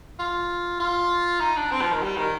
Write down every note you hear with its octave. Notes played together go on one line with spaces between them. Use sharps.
F4
F4
D#4
D4
C4
F3
D#3
G3
D#3